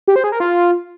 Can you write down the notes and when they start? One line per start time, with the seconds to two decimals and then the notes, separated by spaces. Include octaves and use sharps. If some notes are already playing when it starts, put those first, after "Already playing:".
0.08 G4
0.16 C5
0.24 G#4
0.32 A#4
0.40 F4